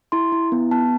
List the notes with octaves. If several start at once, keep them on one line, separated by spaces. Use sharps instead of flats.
E4 C6
E4
B3
B3 A5